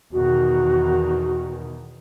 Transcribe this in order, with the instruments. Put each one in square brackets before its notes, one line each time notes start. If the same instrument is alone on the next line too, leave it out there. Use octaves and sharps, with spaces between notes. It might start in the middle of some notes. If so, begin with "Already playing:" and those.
[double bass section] E2 B2 D#3 [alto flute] F#4